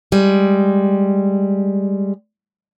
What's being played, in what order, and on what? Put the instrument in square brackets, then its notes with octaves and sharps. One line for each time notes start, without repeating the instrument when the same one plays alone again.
[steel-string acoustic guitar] G3 G#3